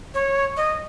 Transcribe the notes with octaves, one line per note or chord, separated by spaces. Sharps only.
C#5
D#5